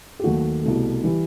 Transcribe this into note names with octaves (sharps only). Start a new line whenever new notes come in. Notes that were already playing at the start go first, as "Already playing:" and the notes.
G4
D#2 D#3 F#3 A3 F#4
C2 B2 A3
E3 G3